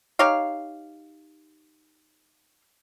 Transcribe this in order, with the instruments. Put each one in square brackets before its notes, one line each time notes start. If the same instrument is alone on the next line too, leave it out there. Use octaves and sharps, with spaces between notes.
[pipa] D#4 G4 C#5 F5